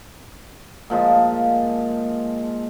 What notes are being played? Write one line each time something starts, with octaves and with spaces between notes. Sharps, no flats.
A#2 F3 G#3